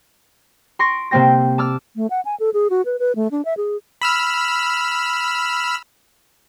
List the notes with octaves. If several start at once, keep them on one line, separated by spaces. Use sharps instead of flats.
C6 C#6 A#6 D7
C3 A#3 C4 C5 G5 A#6
A5 D6 E6 F6
A3
F#5
G#5
A4
G#4
F#4
B4
B4
A3
D4
E5
G#4
B5 E6 F6